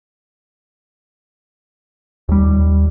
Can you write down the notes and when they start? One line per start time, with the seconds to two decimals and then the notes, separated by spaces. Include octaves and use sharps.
2.29 D#2 G3